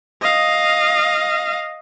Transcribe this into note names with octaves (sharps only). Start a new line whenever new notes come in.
D#5 F5